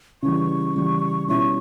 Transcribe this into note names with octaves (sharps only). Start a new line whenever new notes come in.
C#3 E3 G3 C#6
C#3 E3 G3
B2 G3 C#4 E4 C#6